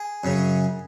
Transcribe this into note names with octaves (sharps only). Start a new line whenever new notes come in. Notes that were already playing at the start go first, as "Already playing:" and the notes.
Already playing: G#4
F#2 C#3